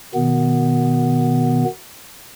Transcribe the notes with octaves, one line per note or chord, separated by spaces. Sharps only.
B2 D#3 B3